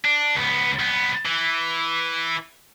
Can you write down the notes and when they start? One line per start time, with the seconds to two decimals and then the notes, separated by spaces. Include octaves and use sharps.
0.05 D4
0.35 C#2 B3
0.79 C2 B3
1.26 E3